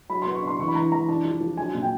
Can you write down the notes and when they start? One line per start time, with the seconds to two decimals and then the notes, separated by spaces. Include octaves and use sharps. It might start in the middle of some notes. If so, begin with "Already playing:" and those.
0.10 F#3 B5
0.22 B3 C6
0.34 C#6
0.43 D4 C6
0.59 E3 C#6
0.68 B5
0.75 E3 A#5
0.92 E3 A#5
1.08 D4 A5
1.25 F3
1.41 F3
1.57 F#3 G#5
1.74 A#2
1.83 G5